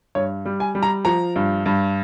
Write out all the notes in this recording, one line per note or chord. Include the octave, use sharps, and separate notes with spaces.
G2 C#5
G3
G#5
G3
A#5
F3 A#5
G2
G2